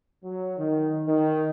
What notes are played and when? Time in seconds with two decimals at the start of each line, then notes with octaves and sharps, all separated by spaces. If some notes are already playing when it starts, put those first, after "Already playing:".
0.24 F#3
0.58 D#3
1.07 D#3